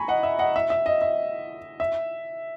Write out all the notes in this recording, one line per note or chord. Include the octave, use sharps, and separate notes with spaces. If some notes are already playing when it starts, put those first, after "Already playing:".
Already playing: G#5 A#5 B5 C#6
D#5 F#5
E5
D#5 F#5
E5
E5
D#5
E5
E5